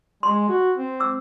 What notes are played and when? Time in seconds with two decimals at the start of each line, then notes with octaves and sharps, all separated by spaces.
0.23 G#3 C6
0.49 F#4
0.78 C4
1.00 D6 E6